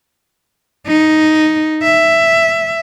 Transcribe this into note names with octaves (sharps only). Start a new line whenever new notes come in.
D#4
E5